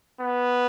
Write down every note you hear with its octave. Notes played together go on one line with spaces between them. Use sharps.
B3